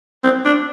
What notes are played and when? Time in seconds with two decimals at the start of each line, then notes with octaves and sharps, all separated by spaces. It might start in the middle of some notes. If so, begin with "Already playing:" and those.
0.24 C4
0.45 D4